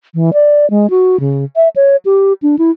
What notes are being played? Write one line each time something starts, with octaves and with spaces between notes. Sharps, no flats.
E3
D5
G#3
F#4
C#3
E5
C#5
G4
D4
E4